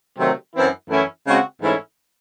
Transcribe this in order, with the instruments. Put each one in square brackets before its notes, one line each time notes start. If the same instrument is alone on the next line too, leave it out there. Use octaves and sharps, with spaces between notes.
[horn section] C3 D#3 F#3 A3 C4
F#2 E3 C4 E4
F#2 E3 A3 C#4 E4
C#3 G#3 C4 F#4
G#2 E3 A3 C#4 E4